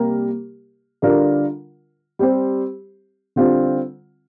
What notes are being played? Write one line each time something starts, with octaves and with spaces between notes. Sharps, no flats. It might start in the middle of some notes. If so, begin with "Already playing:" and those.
Already playing: C3 G3 A#3 G4 A#4
D3 G3 D4 F4 A#4
G3 C4 G4 C5
D3 G3 C4 F4